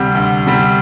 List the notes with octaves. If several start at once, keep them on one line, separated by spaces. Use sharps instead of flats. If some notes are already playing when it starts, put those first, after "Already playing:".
Already playing: D2 C3 G3
D2
C3 G3